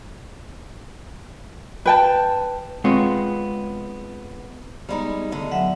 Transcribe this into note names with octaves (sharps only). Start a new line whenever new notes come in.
B4 G5 A5
G#3 B3 C4 F4 C#5
G3 G#3 B3 D#4
A2 D3 D#5
F#3 E5 F#5